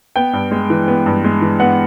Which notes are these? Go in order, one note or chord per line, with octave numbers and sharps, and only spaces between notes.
B3 G5
G2
G#3
E3
B3
G2
G#3
E3
B3 F#5